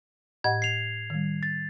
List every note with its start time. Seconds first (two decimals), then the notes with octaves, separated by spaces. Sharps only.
0.44 A2 D#5 F#5 G#6
0.62 C7 F7
1.10 D#3 G3
1.43 A6